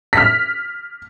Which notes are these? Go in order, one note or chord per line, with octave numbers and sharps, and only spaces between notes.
F6 B6